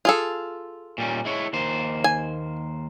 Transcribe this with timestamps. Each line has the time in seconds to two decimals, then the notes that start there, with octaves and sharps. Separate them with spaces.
0.05 F4 G#4 A4
0.98 A#2 G3 C#4
1.25 G#3 E4 C#5
1.53 D#2 A#3 C5
2.04 G#5